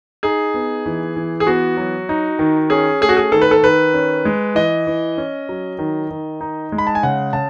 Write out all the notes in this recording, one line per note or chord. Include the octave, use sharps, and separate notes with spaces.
D#4 G#4
B3
E3
E3
G#4
B3 F#4
F#3
D#4
D#3
C#4 G#4
A3 G#4
F#4
G#4
D#3 A4
B4
A4
D#3 B4
C#4
G#3
E3 D#5
E3
C#4
F#3
D#3
D#3
D#4
G#3
B5
A5
G#5
C#3 F#5
C#3 A5